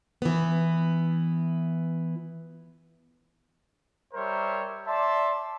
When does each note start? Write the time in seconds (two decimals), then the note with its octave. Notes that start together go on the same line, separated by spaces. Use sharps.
0.22 E3 B3
4.14 G3 A#4 C5 C#5 E5
4.87 D5 E5 A5 C6